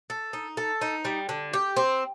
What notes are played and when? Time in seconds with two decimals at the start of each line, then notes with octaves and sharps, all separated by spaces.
0.10 A4
0.33 D#4
0.57 A4
0.81 D#4
1.05 G3
1.29 D3
1.53 G4
1.77 C4